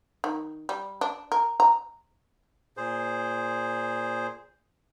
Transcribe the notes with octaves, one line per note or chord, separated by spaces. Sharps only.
D#3
G3
D4
A#4
A#5
A#2 G#4 C5